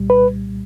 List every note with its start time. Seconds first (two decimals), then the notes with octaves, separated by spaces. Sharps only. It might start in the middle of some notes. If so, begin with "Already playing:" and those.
Already playing: C2 A#2 G3
0.10 B4